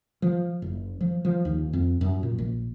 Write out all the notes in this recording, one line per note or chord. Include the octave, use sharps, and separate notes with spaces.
F3
F#1
F3
F3
D#2
F2
F#2
A#2
A#1